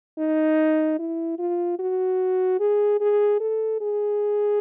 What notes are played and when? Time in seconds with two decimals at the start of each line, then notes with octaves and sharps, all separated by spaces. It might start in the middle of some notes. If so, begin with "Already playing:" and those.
0.18 D#4
0.99 E4
1.39 F4
1.79 F#4
2.60 G#4
3.00 G#4
3.40 A4
3.81 G#4